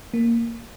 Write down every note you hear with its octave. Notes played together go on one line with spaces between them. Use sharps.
A#3